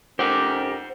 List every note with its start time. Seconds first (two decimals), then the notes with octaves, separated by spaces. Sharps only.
0.19 F2 C#4 G4 A#4 C5 F#5